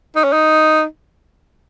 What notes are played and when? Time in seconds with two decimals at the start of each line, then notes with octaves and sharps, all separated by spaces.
0.16 D#4
0.24 C#4
0.33 D#4